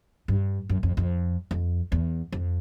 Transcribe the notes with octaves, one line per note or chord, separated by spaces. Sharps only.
G2
F#2
F2
F2
F2
E2
F2